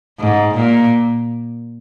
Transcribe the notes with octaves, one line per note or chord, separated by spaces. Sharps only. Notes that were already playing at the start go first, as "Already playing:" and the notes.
G#2
A#2